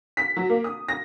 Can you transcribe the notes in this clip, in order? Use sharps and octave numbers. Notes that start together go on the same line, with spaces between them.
B6
F#3
A#3
D#6
A#6